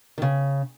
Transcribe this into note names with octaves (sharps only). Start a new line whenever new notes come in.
D#3
C#3